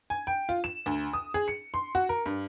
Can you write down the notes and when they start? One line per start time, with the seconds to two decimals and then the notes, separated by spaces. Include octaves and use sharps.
0.10 G#5
0.27 G5
0.49 F4
0.64 E7
0.86 D2
1.13 D#6
1.34 G#4
1.48 C#7
1.74 C6
1.95 F#4
2.09 A#4
2.26 G2